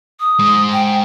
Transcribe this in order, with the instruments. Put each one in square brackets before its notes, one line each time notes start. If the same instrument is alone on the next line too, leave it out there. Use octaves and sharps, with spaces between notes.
[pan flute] D#6
[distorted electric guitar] G#3 C5
[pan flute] G5